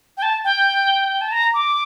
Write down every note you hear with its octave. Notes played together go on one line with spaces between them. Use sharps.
G5
A5
G5
A5
A#5
D6